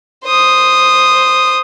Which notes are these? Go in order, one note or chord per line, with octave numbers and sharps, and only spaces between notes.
C5 D#6